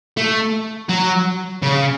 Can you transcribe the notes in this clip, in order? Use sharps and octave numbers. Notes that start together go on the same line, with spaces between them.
A3
F#3
C#3